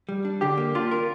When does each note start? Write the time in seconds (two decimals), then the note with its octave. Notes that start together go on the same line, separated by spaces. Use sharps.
0.09 G3
0.25 D4
0.41 D3 G4
0.58 A#3
0.75 D4 F4
0.91 A#4